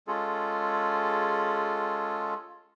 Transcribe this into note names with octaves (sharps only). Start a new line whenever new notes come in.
G#3 C#4 F4 G#4 A4